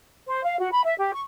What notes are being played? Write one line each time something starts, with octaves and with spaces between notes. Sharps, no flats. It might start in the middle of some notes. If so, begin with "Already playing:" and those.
C5
F5
F#4
B5
E5
G4
C#6